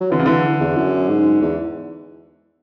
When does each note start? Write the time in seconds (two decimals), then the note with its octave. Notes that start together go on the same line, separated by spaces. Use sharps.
0.01 F#3
0.11 D3 E3
0.19 C#3
0.26 D3 E3
0.60 E2
0.77 F#2
1.09 G#2
1.42 E2